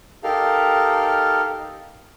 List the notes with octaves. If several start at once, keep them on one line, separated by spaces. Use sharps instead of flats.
D#4 G4 A4 A#4 F5